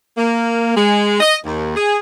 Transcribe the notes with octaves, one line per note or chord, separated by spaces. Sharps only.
A#3
G#3
D#5
D#2
G#4